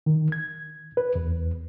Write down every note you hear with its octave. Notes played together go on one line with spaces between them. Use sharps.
D#3
G#6
B4
E2